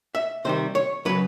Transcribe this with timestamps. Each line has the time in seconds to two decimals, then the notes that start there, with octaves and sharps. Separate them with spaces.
0.15 E5
0.45 C3 D#3 G3 C5
0.75 C#5
1.05 C#3 F#3 B4